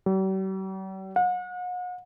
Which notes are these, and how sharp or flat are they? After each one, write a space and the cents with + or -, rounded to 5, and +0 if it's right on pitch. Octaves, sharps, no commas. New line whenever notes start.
G3 -45
F#5 -40